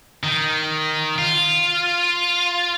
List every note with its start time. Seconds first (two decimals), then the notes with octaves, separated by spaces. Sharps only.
0.23 D#3
1.18 F4